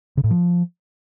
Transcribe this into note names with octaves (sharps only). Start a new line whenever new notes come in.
C#3
A2
F3